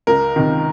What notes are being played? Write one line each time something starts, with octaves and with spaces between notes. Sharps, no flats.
C#2 A#4
C3 D#3